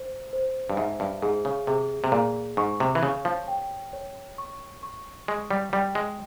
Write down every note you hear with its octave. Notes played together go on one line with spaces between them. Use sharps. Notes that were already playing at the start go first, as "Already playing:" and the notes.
Already playing: C5
C5
G2
G#2 E5
G2
G#2 G#4
C#3
C3 G#4
C3
A#2 G#4
G#2 C#6
C3
E3
C#3 C#5
F3
G5
C#5
C#6
C#6
G#3 C#6
G3
G3 G5
G#3